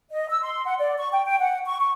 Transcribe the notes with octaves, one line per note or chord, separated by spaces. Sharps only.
D#5
E6
C6
F#5
D5
C#6
G5
G5
F#5
C#6
C#6